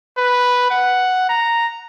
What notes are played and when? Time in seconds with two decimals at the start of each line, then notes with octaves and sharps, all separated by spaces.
0.18 B4
0.71 F#5
1.29 A#5